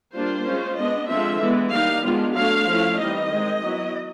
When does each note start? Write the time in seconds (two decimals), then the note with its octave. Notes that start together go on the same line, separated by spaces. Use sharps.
0.15 G3 A#3 D4 F4 C5
0.46 G#3 C#4 F4
0.78 G#3 B3 D4 D#5
1.09 D3 F3 G#3 C4 F4 E5
1.41 E3 G#3 B3
1.72 G3 A#3 D#4 F5
2.04 D#3 G#3 B3 D4 F4
2.35 F#3 A3 D4 F5
2.67 F3 A3 C#4 E4
2.98 E3 G3 C4 D#4 D#5
3.30 D#3 G#3 C4 D#4
3.62 F#3 B3 E4